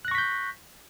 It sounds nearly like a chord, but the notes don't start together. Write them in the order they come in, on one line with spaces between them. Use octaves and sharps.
F#6 A#6 C#6 B6 G6